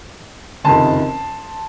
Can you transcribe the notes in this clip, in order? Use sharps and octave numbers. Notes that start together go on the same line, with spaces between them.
F#1 F2 C3 D#3 A5 C6